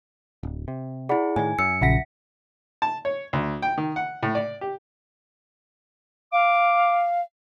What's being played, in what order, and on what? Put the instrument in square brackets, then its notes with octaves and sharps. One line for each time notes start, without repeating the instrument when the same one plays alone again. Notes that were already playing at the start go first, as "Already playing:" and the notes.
[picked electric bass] D1
C3
[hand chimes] E4 G#4 [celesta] D5 F#5 B5
[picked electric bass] A2 D#3 [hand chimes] G#5
[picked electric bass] F#2 [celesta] E6 [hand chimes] C#7
[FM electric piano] A#1 C#3 A#6 [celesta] E5 F#5 B6
[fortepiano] A5
C#5
D2
G5
D#3
F#5
A2
D5
G4
[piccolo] F5 [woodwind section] D6